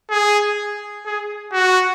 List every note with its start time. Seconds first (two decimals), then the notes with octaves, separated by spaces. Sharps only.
0.10 G#4
1.06 G#4
1.52 F#4